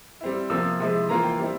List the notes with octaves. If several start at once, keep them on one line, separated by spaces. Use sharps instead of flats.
G3 C4 E4
C3 F3 A#3 E6
C3 F3 G#3 E4
E3 A#3 F4 A#5
G5
G3 C4 E4